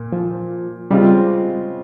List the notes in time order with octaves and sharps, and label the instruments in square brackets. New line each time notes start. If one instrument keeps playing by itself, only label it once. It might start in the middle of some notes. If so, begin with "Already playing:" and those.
Already playing: [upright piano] A#2 A#3
[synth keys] F3
[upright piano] C#3 G#3 C4 F4 [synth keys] G3